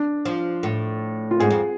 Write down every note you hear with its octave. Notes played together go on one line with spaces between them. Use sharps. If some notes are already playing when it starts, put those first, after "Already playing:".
Already playing: D4
F3
A2
F4
G#2 G#4
F2